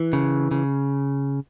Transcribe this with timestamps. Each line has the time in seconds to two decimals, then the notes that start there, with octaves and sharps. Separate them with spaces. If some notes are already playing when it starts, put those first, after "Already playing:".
Already playing: E3
0.13 C#3
0.51 C#3